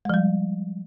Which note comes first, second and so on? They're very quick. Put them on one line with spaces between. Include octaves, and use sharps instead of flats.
G#3 F3 G3